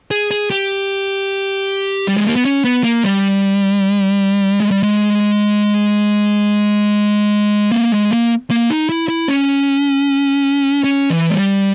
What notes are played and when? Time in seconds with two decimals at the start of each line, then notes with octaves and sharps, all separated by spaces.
0.11 G#4
0.31 G#4
0.50 G4
2.08 G3
2.17 G#3
2.26 A#3
2.36 B3
2.45 C#4
2.64 B3
2.84 A#3
3.04 G3
4.60 G#3
4.71 G3
4.83 G#3
7.72 A#3
7.92 G#3
8.11 A#3
8.50 A#3
8.70 D#4
8.89 E4
9.08 E4
9.28 C#4
10.84 C#4
11.10 E3
11.30 G#3
11.36 G3